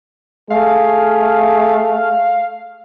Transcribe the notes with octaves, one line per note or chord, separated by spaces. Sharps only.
A3 G#4 F5